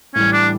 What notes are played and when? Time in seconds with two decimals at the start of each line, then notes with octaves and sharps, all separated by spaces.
0.15 A2 E3 G3 C#4
0.33 D4